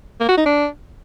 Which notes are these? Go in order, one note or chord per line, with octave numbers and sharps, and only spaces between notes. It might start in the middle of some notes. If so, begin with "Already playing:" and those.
A#3
F#4
D#4
D4